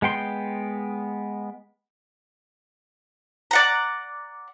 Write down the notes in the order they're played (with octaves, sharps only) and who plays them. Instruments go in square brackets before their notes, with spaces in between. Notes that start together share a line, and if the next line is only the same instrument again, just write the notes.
[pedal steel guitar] G#3 B3 G5 C6
[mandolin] D5 F#5 A#5